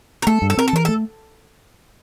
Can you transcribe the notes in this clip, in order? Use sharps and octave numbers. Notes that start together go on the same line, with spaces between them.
A#4
A3 A4
G2
A4
C4 A#4
A4
E3 A#4
A4
A3